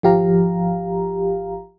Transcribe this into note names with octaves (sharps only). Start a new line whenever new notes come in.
G#1 F3 G4 F5 A#5